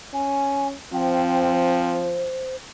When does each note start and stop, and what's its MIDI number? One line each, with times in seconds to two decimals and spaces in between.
0.14 0.73 61
0.14 0.67 80
0.93 2.32 53
0.93 2.08 60
0.93 1.48 79
1.53 2.56 72